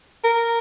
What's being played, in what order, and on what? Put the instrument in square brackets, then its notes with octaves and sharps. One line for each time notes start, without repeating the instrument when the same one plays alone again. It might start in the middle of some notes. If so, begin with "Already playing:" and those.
[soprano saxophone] A#4